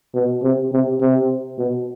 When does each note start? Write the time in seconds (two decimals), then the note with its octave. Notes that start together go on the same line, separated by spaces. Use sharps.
0.15 B2
0.43 C3
0.72 C3
1.01 C3
1.58 B2